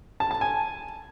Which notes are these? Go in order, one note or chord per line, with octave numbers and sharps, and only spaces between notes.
A5
A5
G#5